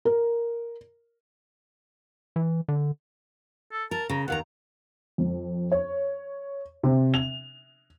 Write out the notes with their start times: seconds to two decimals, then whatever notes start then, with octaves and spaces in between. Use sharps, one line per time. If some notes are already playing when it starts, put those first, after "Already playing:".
0.05 A#4
2.36 E3
2.68 D3
3.72 A4
3.91 A#4 A5
4.10 C#3 A#5
4.28 D#2 D#3 F#5 A#5
5.18 F2
5.72 C#5
6.83 C3
7.14 F7